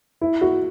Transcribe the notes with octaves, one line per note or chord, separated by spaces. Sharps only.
E4
F#4